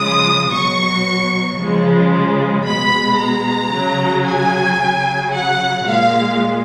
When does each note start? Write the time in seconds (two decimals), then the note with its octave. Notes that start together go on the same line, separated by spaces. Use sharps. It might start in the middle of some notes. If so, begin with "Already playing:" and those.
Already playing: C#3 F3 G#3 D#6
0.52 B2 F#3 C#6
1.59 C#3 F3 G#3
2.65 B2 G#3 B5
3.19 A#5
3.72 C#3 F#3
4.25 G#5
4.79 C#3 F#3
5.32 F#5
5.85 A#2 G#3 F5